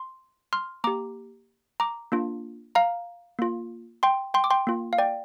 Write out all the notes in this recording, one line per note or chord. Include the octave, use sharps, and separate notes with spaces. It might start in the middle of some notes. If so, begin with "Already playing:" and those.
Already playing: C6
C6 F6
A#3 G4 A#5 D6
A#5 D6
A#3 D4 F4
F5 A#5
A#3 F4
G5 C6
G5 C6
D6
G5 C6
A#3 F4
F5
D5 G5